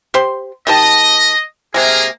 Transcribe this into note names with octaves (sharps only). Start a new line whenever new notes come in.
G4 C5 C6
D#3 G4 D#5 A5
C3 G#3 A#3 G#4 A#4